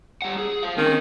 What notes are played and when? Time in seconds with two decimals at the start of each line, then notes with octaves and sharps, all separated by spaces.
0.22 G3 F#5
0.38 G#4
0.63 C5 F5
0.78 D#3 C4 C#4